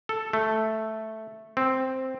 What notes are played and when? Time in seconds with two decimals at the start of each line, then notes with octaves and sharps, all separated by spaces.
0.09 A4
0.33 A3
1.57 C4